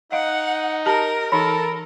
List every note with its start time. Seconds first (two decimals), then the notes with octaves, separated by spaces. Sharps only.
0.12 D#4 D#5 F5 F#5
0.86 G4 A#4 A5 A#5
1.32 E3 D#4 A4 A#4 B5